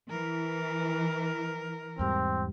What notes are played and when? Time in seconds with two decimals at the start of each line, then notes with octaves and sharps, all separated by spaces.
0.10 E3 A#4
1.99 E2 G#2 G3 C4